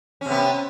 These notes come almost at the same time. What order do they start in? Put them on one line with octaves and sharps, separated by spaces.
C#4 C3 B3